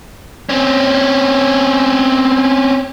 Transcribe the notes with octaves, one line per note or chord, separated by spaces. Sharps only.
C4 C#4